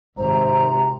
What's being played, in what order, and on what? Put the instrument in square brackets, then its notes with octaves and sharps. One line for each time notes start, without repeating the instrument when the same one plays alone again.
[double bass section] G#1 [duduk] C3 [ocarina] C5 [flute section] A#5